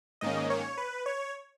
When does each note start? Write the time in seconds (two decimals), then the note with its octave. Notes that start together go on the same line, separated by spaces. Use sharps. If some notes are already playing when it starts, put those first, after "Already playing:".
0.21 G#2 D#3 A#3 C#4 D#5
0.50 C#5
0.77 B4
1.06 C#5